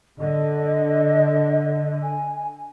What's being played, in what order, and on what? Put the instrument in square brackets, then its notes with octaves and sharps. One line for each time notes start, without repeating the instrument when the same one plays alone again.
[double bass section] D3 [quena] D#5
[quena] G#5